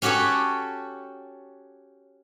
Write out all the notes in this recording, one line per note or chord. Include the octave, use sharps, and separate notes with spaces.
C#4 F#4 G4 A4 C#5